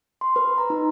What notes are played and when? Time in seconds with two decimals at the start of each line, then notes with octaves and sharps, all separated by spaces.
0.21 C6
0.36 B4
0.58 A#5
0.70 D#4